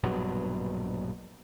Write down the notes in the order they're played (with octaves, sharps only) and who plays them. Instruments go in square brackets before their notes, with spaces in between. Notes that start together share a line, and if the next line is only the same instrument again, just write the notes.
[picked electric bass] A#1 G2 B2 F#3